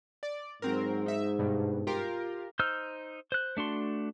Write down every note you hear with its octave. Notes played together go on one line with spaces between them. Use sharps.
D5
G#2 F#3 C4 A#4
D#4 E5
G2 B2
F4 G4 A#4
D#4 C5 E6 F6 G6
C5 F#6
A3 D4 F#4 C6